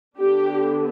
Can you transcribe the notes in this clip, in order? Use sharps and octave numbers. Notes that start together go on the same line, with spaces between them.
D3 B3 D4 G4